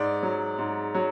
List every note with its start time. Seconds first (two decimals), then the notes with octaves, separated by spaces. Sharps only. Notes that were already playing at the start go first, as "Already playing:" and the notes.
Already playing: G#2 D5
0.23 F#3
0.58 G#2
0.95 F#3